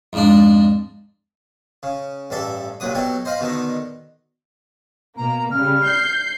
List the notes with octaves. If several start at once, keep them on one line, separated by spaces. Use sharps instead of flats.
F2 G#2 D4
C#3
A1 G2 A4 E5
C2 A#2 F#3 B4 D#6
B2 F#3 G4 A4
C5 D#5 F5 B5
B2 D3 D#3 D#4
B2 A#3 A#5
C#3 G3 F6
G6 C7